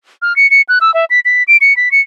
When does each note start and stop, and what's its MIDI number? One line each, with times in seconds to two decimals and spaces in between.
0.22 0.36 89
0.36 0.49 97
0.51 0.62 97
0.69 0.79 90
0.81 0.94 88
0.94 1.05 76
1.10 1.20 95
1.25 1.43 95
1.48 1.57 98
1.61 1.76 97
1.77 1.92 95
1.92 2.01 97